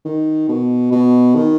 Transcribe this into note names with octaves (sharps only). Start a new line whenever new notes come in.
D#3
B2
B2
D#3